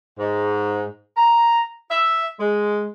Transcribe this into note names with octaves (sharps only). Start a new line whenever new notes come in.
G#2
A#5
E5
G#3